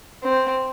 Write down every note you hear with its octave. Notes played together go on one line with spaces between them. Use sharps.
C4